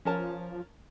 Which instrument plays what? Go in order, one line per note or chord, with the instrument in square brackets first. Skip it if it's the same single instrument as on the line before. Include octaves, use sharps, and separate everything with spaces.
[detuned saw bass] F3 [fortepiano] C#4 A#4 A5